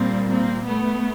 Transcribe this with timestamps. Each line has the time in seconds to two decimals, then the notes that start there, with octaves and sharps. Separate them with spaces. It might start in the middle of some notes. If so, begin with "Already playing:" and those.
Already playing: A#2 G3 A#3 C4
0.30 A#3 C4
0.66 A3 B3